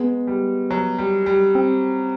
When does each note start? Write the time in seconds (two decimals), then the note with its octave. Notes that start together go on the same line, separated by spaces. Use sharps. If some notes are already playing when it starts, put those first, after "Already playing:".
Already playing: G#3 B3
0.27 G3
0.70 F#3
0.98 G3
1.26 G3
1.55 C4